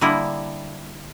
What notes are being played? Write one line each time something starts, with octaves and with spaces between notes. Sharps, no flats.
D3 G3 A#3 E4 D#5